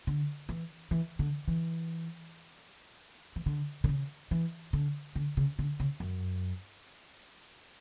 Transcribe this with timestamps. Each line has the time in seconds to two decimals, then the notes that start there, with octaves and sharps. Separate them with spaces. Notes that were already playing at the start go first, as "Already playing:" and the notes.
0.07 D3
0.49 E3
0.91 E3
1.19 D3
1.48 E3
3.36 E3
3.46 D3
3.84 D3
3.89 C#3
4.31 E3
4.73 D3
5.16 D3
5.37 C#3
5.59 D3
5.80 C#3
6.00 F#2